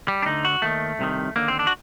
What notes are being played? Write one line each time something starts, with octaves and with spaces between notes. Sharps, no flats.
G3
D4
D2 D3 D#4
F#4
D#2 D#3 A3
C2 C3 D#3
D#2 D3 A#3
C4
D4
F#4